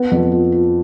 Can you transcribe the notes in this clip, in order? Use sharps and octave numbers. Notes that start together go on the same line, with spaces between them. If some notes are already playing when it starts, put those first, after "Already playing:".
Already playing: B3
F2
F3
F4